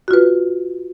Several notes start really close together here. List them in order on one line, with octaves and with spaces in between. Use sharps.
F#4 F4 B4